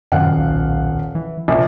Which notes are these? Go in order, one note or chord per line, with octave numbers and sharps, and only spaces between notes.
D#1 F#2 F5 F#5
B1
E3
A#1 C3